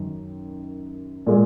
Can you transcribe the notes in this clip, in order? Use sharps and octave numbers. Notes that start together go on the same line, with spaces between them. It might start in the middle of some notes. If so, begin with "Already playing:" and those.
Already playing: F#2 D#3
A#2 G#3